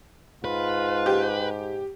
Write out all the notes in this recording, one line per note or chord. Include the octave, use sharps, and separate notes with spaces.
G#2 F4 B4
G4